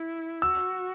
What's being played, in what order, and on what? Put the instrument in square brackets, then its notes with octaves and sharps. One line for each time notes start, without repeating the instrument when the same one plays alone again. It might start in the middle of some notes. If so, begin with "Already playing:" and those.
Already playing: [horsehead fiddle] E4
[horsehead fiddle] F#4 [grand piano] E6